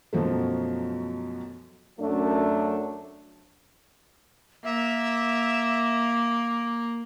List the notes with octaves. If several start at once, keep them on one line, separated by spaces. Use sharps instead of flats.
F#2 B2 F3 F#3 A3
F#2 F#3 A3 D4
A#3 E5